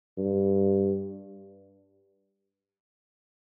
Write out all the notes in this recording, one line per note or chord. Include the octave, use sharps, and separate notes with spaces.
G2